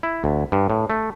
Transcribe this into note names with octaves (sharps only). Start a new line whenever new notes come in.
E4
D2
G2
A2
A3